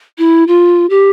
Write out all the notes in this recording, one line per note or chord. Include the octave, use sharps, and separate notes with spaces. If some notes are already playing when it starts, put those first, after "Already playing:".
E4
F4
G4